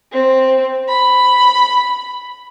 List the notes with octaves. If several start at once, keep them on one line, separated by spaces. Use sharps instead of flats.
C4
B5